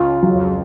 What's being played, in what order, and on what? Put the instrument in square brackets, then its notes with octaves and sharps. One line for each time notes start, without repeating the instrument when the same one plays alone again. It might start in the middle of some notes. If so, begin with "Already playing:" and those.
Already playing: [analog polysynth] C#2 C#3 [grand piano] F4
[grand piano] F#3
[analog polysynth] F2